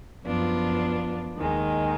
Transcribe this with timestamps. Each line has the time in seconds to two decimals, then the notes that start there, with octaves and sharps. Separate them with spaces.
0.25 F#2 F3 B3 D4 F4
1.37 D#2 D#3 G#3